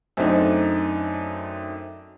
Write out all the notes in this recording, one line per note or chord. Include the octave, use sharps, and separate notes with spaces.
F#2 A3 C4 D4 D#4